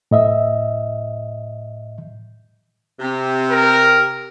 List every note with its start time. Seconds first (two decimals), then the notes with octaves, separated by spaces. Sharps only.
0.11 A2 D#5 E5
3.00 C3
3.51 A#4